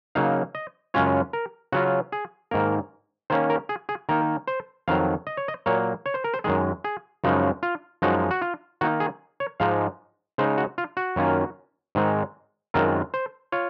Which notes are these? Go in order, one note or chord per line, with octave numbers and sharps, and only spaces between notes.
C#3 F#3 A#3 D#4 F5
D#5
F#2 C#3 G#3 C#4 F4 C#5
A#4
C#3 F#3 C#4 F4 F#4
G#4
G#2 D#3 A#3 A#4
D#3 A#3 C#4 C5
A#4
G#4
G#4
D#3 A#3 D#4 A#4
C5
F2 D#3 F#3 F5
D#5
C#5
D#5
A#2 F#3 A#3 C#5
C#5
C5
A#4
C5
F#2 D#3 G#3 G#4
G#4
F#2 C#3 F3 G#3 D#4
F4
F#2 F3 G#3 D#4 F#4
F#4
F4
D#3 A#3 D#4 F#4
G#4
C#5
G#2 F3 G#3 D#4 F5
C#3 G#3 D#4 C5
F#4
F4
F#4
F#2 D#3 A#3 C#4 F4
G#2 D#3 G#3 C4 D#4
F#2 D#3 G#3 C4 F4 A#4
C5
F4 C#5